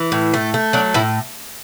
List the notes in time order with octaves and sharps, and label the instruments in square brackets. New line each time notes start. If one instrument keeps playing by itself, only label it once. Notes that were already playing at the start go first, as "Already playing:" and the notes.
Already playing: [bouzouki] E3
A2
A3
A3
F#3 D4
A2 E4